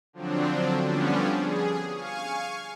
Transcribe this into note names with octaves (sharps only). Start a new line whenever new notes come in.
D3 F3 F#3 C4 D4
D3 F3 G3 B3 C#4 D4
G#4
F5 G#5 C#6